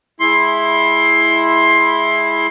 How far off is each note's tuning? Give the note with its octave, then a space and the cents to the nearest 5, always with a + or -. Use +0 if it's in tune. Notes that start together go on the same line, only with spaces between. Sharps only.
G#3 +0 E4 +0 C6 +15